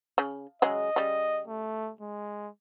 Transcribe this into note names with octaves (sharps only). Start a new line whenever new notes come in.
C#3
C#3 F#3 G#3 D#5
C#3 G3
A3
G#3